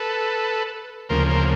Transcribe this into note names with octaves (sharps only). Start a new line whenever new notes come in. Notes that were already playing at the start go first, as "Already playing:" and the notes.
Already playing: A4 B4
D2 C#3 F3 A#3 A#4 C5
A#4 C5